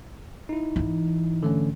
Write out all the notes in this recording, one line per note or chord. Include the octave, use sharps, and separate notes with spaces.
D#4 E4
G#2 E3
D3 A3 C#4